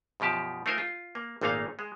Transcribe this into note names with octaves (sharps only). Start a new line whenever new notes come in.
F#2 B2 F3 G4 A5
A3 D#4 F4 A#4 C5 G#5
F4
A#3
G#1 A#2 A3 A#3 D#4 F5
G#3